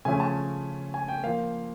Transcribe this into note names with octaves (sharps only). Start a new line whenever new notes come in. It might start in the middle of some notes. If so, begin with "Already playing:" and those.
C#3 F3 A3 C#4 G#5
A5
G#5
G5
F3 A#3 F5